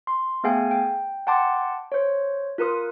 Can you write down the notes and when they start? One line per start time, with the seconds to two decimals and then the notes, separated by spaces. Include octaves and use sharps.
0.07 C6
0.44 A3 B3 G#4 F5 G5 G#5
0.71 G5
1.27 F#5 G5 A5 C6 D6
1.92 C5 C#5
2.58 F4 A#4 B4 D#6